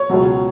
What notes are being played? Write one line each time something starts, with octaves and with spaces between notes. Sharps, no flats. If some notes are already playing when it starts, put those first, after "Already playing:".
Already playing: C#5
C#2 B2 F#3